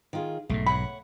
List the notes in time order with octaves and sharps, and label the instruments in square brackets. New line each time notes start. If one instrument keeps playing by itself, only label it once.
[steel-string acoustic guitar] D#3 F4 G#4
[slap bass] B1 G#2 [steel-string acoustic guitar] A3
[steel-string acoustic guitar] C#5 F#5 [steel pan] B5